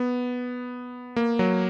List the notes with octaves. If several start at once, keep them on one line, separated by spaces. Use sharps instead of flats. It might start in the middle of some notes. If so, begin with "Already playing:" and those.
Already playing: B3
A#3
F#3